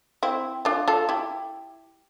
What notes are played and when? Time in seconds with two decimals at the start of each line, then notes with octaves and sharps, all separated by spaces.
0.23 C4 E4
0.65 D4 F4
0.88 F4 A4
1.09 E4 G4